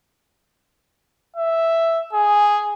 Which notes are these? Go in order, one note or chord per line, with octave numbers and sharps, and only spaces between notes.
E5
G#4